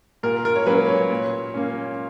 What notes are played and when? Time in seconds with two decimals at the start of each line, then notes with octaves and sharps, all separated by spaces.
0.23 A#2 A#4
0.45 A#4
0.56 C#5
0.66 F#3 A#3 C#4 B4
0.89 C#5
1.11 A#2
1.54 A#3 C#4